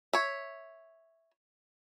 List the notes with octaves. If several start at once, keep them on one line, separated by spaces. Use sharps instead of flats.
C#5 E5